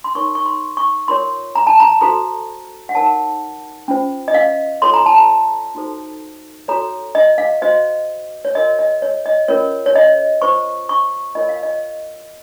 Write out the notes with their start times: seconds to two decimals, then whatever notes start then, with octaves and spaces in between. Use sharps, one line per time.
0.04 C6
0.15 D#4 A#4 C#5 C#6
0.35 C#6
0.46 C6
0.77 C#6
1.08 F4 A#4 C#5 C6
1.55 A#5
1.67 A5
1.80 A#5
2.01 F#4 A4 C5 A#5
2.89 F#5
2.94 D#4 A#4 C#5 A5
3.88 C#4 F4 C5
4.28 D#5
4.34 F5
4.82 F4 A4 C#5 C6
4.94 A#5
5.06 A5
5.18 A#5
5.75 D#4 F#4 A4 C5
6.68 F#4 A4 C#5 A#5
7.15 D#5
7.38 F5
7.62 F#4 C5 D#5
8.45 C#5
8.55 F#4 A#4 C#5 D#5
8.79 D#5
9.02 C#5
9.26 D#5
9.48 C#4 F4 A#4 C#5
9.86 C#5
9.96 D#5
10.42 F4 C5 C#6
10.89 C#6
11.35 F4 A#4 C#5 D#5
11.49 F5
11.63 D#5